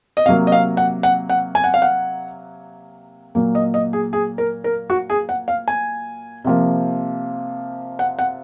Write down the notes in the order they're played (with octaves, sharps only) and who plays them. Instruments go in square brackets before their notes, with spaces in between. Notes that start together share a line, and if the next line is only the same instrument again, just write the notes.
[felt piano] D#5
C3 F5
F#3 A#3
D#5
F5
F#5
F#5
F#5
G#5
F#5
F5
F#5
A#2 F#3 A#3
D#5
D#5
G#4
G#4
A#4
A#4
F#4
G#4
F#5
F5
G#5
C3 F3 A#3
F#5
F#5